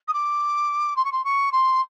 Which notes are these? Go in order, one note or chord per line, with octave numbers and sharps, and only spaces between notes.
D#6
D6
C6
C#6
C6
C#6
C6